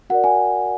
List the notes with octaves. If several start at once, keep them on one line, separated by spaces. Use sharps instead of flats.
F#4 A#4 D5 F#5
G#5